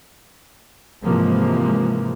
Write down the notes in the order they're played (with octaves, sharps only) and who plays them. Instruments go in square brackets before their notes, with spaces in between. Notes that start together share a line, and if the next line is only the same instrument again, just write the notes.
[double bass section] G#2 C3 E3 F3 G#3 A#3